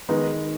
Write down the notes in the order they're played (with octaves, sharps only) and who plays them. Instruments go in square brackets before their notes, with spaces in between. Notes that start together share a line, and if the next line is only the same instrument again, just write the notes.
[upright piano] D#3 G#3 [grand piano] B3 D#4